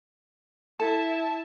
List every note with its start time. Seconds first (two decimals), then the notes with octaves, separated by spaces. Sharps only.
0.80 E4 A4 E5 A5